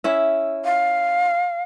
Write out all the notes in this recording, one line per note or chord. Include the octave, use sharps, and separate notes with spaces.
C#4 E4 E5
F5